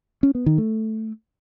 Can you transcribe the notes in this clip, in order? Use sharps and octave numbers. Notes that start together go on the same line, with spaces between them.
C#4
B3
D#3
A3